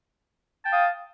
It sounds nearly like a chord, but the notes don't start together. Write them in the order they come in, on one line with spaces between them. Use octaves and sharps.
A5 G5 F5 D#6